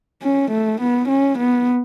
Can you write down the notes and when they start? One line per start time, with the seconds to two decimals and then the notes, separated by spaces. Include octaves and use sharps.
0.23 C#4
0.51 A3
0.81 B3
1.09 C#4
1.38 B3